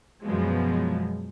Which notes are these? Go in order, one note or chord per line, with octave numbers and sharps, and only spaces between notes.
F#2 B2 F3 F#3 G#3